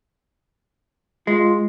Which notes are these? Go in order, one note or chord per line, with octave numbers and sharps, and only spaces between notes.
G#3 F4